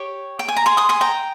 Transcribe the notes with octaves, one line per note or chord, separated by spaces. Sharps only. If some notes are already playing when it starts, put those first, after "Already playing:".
Already playing: G4 C#5
G5
G#5
A#5
G#5 C6
C6 D#6
G#5 C6
G5 A#5